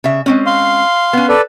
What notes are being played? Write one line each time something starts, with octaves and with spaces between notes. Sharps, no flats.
C#3 E5
G#3 C4 C#4
F5 C6
B3 C#4
A4 B4 D5